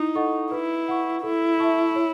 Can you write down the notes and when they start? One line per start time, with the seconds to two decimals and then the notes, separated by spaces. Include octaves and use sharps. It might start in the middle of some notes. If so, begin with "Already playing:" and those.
Already playing: D#4 E4
0.15 A4 D#5 F#5 C#6
0.51 E4 B4
0.88 F#5 C#6
1.23 E4 A4
1.60 E5 A5 C#6
1.96 C#5